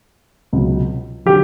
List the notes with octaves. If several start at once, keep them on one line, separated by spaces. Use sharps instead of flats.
C#2 B2 F#3
D3 F#3 G4